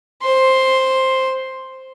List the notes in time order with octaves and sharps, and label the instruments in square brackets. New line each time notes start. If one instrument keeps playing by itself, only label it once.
[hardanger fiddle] C5 C6